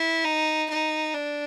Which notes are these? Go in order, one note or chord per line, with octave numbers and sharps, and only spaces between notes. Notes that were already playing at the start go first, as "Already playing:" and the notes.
Already playing: E4
D#4
D#4
D4